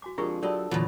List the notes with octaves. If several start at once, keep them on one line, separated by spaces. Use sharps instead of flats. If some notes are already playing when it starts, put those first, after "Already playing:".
F#4 G#5 D6
F2 G#3 D4 F4 G4 G#4 A#4 A#5
F#3 G4 A4 D5 D#5 B5
E2 A#2 D3 F#3 F4 A4 C#5 B5